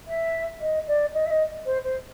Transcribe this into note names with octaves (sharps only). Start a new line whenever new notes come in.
E5
D#5
D5
D#5
E5
D#5
C5
C5